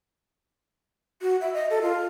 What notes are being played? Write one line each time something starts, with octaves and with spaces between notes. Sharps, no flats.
F#4
E5
D#5
A4
F4